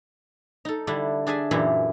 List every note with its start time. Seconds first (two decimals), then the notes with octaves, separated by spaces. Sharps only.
0.65 D#4 A4
0.87 D3 G3 D4 E4
1.27 D4 G#4 D5 E5 G#5
1.51 F#2 A#2 E3 E4 G4